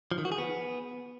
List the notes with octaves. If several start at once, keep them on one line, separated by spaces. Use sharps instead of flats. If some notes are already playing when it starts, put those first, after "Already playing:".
F3
D#3
F#4
G#4
B3